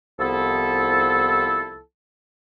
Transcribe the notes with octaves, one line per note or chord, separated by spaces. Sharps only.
C2 F3 B3 E4 A4